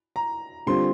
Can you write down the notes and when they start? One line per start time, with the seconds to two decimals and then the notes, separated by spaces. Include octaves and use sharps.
0.16 A#5
0.66 D3 G3 C4 F4 C6